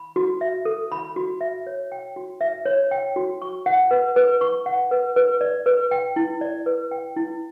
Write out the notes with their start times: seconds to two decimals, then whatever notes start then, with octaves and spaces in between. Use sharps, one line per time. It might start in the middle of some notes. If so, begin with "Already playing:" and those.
Already playing: B5
0.16 F#4
0.41 E5
0.65 A4
0.92 B5
1.16 F#4
1.41 E5
1.67 C#5
1.92 G5
2.16 F#4
2.41 E5
2.66 C#5
2.91 G5
3.16 F#4
3.42 C#6
3.66 F#5
3.91 B4
4.16 B4
4.41 C#6
4.66 F#5
4.91 B4
5.16 B4
5.41 D5
5.66 B4
5.91 G5
6.16 E4
6.41 D5
6.66 B4
6.91 G5
7.16 E4